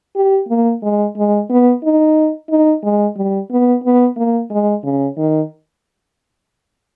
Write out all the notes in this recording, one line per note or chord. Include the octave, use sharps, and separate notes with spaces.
G4
A#3
G#3
G#3
B3
D#4
D#4
G#3
G3
B3
B3
A#3
G#3
C#3
D#3